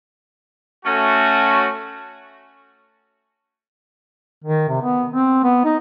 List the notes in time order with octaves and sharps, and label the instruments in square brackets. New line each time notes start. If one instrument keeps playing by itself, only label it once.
[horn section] A3 C#4 F#4
[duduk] D#3
C3
B3
C4
B3
D#4